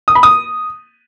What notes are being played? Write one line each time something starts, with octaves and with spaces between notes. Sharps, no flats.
D#6
B5
D#6